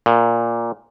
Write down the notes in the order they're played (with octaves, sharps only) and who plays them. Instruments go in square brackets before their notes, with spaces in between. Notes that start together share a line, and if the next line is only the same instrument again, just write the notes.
[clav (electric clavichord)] A#2